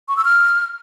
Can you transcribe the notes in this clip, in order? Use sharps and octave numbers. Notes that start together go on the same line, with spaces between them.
C#6
E6
F6